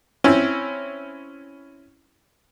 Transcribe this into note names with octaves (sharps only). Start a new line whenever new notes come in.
C4 C#4 E4